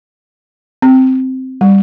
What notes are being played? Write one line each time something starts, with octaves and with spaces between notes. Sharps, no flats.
C4
G3